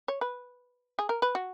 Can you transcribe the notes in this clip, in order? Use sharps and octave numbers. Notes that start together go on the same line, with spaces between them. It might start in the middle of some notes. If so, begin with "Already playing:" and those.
C#5
B4
G#4
A#4
B4
F#4